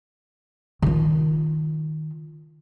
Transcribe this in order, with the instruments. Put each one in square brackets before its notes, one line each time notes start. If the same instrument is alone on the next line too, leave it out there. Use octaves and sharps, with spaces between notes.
[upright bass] D#3 F4